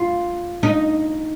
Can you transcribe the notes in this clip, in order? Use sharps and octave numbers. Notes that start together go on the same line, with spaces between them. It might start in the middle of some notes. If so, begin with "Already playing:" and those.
Already playing: F4
D#4